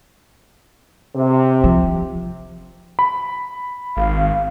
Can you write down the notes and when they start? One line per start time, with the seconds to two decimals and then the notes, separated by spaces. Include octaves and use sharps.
1.14 C3
1.64 F3
2.99 B5
3.97 G#1 F5